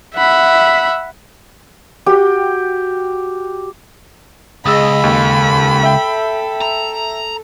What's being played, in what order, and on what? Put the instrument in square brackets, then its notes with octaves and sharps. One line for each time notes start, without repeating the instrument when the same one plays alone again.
[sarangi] E5 [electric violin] F#5 B5
[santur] F#4 G4 G5
[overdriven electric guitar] C#2 [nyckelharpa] G#4 D#5 [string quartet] B5 [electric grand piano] D#6 E6
[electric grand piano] D#2 [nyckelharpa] A4
[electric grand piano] E5 G5
[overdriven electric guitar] A#5